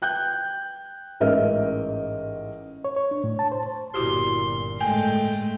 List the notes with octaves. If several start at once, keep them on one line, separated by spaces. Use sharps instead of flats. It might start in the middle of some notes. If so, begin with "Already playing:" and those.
G5 F#6 G6
A1 G#2 A#4 D#5 E5 F6
C#5
C#5
D4
A2
A5
C5
G1 A#2 E4 F#4 G4 C6
A2 G#3 A3 G5 G#5